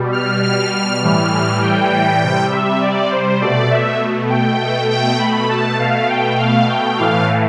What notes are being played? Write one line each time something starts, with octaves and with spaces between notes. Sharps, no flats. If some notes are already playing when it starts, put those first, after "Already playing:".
Already playing: B2 G3
F6
F6
F6
A2 E3 G3 F6
G5
C3 G3
E5
D5
C5
B2 A3 D5
E5
G5
B2 A3
G5
B5
A5
B2 A3 F5
G5
F5
G5
A2 E3 A3 F5